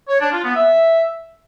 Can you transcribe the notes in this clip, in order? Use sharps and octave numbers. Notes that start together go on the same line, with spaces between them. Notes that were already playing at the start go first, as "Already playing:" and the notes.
C#5
D4
F4
B3
E5